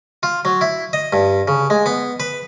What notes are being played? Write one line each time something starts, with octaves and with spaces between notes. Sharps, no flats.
F4
F#3
E4
D#5
G2
C#3
G#3
B3
B4